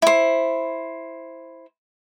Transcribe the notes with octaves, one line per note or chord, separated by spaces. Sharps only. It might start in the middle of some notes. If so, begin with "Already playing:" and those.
E4 C5